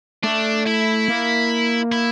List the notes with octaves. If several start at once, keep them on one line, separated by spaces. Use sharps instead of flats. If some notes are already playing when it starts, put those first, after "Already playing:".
A3 D4
E4
A#3
E4